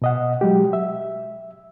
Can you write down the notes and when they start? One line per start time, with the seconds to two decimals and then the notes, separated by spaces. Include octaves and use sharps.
0.02 B2 D#5 F#5
0.41 F#3 G#3 G4
0.73 E5